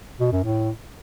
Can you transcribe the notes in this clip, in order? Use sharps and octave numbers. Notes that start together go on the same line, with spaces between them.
B2
F#2
A2